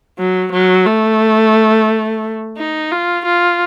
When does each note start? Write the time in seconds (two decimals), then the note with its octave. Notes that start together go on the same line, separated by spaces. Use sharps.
0.19 F#3
0.52 F#3
0.87 A3
2.58 D#4
2.92 F4
3.26 F4